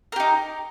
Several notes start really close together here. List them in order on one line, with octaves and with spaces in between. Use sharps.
A#4 G4 D#4